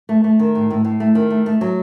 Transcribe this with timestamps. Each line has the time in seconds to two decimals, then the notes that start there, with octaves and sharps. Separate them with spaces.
0.09 A3
0.24 A3
0.39 D#3
0.55 A2
0.70 A2
0.84 A2
1.00 A3
1.15 D#3
1.30 A3
1.46 A3
1.61 F#3